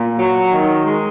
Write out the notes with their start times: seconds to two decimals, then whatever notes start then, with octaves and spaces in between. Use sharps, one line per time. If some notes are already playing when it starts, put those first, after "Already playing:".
Already playing: A#2
0.19 F#3
0.52 D#3
0.85 G#3